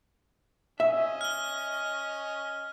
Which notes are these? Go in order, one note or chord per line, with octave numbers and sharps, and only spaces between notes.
C#4 D#5 E5
F6 G7